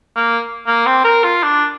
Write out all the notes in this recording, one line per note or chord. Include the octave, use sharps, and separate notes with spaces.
A#3
A#3
C4
A#4
F4
D4